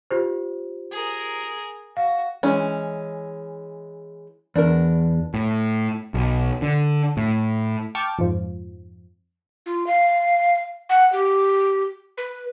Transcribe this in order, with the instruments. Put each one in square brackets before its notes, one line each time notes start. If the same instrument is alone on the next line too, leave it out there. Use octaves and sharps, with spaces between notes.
[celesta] F4 G4 C5
[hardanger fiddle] G#4 A#4
[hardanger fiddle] F#4 [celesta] F5
[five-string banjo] E3 G#3 C#4
[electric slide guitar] E2 [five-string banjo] D4 A#4
[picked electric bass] A2
B1
D3
A2
[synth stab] G5 A5 C#6 D6 F6
F2 G#2 F3
[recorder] F4
F5
F#5
G4
B4